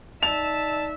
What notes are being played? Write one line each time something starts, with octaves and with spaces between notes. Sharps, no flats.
D#4 D5 E5 A5 F7